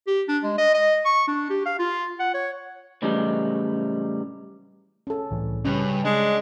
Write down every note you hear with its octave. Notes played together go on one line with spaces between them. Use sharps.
G4
D4
G#3
D#5
D#5
C#6
D4
G4
F5
F4
F#5
C#5
A2 C#3 E3 F#3 G3 D#4
C#4 A4
C2 A2 E3
G2 C#3 C#4
G#3 D4